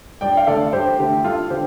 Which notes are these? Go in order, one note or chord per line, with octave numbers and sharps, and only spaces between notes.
G2 D5 G5
F5
D3 A3 A4 D5
G2 G4 C5
D3 A3 G4
G2 F4 A4
D3 G4 C5